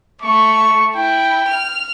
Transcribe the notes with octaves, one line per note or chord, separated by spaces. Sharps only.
A3 C#6
E4 G5
F6